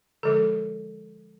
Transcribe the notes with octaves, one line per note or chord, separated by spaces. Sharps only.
D3 F3 G#3 A4